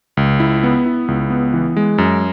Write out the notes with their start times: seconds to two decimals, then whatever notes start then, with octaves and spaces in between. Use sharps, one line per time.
0.17 C#2
0.40 E4
0.64 B3
0.86 E4
1.08 C#2
1.30 B3
1.54 E3
1.77 G#3
1.98 F#2